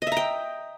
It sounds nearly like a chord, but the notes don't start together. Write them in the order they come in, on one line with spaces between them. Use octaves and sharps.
D#5 E5 A#5 G5